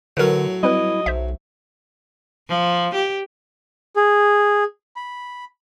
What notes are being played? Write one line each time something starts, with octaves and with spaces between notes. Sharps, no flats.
A2 D3 F#3 A#4 B4
G3 C4 E4 B4 D#5
B1 C5 E5
F3
G4
G#4
B5